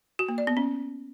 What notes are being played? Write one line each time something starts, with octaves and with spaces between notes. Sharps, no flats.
F#4
A#3
D5
B3
C#4